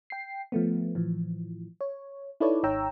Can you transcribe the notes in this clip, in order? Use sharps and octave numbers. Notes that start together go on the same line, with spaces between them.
G5 C7
F3 A3 B3
A2 E3 F3
C#5
D#4 E4 A4 B4 C#5 D5
G#1 D#4 C#5 G5 A#5 E6